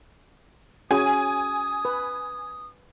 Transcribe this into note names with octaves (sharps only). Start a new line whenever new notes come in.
C#4 F#4 G#4 G#5 D#6
B4